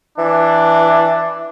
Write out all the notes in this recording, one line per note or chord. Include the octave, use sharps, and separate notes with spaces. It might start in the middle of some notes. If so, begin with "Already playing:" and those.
E3 D4